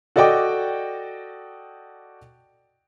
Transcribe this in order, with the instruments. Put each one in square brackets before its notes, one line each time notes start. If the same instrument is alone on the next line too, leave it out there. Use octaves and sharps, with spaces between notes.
[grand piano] F#4 A4 D5 D#5 G5 D6